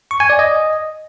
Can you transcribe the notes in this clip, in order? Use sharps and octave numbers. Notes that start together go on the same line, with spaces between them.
C#6
G#5
D5
D#5